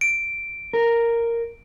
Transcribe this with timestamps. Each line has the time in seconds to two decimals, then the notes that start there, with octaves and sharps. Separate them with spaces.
0.01 D7
0.73 A#4